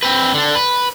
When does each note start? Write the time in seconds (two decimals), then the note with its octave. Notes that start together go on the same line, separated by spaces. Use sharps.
0.03 C4 B4
0.34 D3 D4
0.55 B4